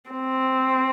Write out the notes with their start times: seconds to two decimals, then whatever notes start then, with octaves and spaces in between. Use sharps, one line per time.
0.11 C4